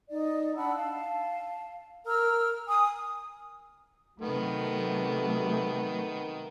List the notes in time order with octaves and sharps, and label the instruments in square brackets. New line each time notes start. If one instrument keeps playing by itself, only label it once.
[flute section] D#4 D5
D4 F#5 B5 E6
F5 A5
A#4 A#5 E6 F6
G#5 D#6
[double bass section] C3 F#3 A3 [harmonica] D#3 B3